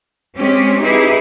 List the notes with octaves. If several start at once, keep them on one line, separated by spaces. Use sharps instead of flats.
G#3 C4 C#4 G4
D#4 E4 G4 G#4 B4